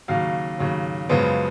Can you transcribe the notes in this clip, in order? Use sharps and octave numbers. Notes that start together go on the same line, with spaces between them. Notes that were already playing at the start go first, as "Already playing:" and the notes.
D#2 C#3 F#3 F5
D#2 C#3 F#3
F#2 C#3 F3 G#3 B3